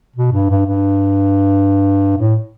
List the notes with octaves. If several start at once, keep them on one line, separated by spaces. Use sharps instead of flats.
B2
G2
G2
G2
A2